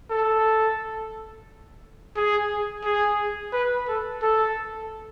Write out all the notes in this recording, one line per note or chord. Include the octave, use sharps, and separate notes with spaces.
A4
G#4
G#4
B4
A4
A4